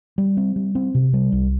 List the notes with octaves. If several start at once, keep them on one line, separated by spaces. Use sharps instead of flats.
G3
C4
G3
C4
C3
G3
C2